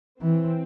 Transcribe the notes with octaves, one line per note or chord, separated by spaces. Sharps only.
E3 C4